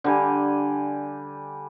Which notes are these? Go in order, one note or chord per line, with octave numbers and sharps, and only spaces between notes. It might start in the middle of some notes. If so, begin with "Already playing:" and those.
D3 G3 G#5